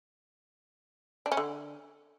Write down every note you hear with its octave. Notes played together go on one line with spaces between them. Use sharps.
D4
C#4
D3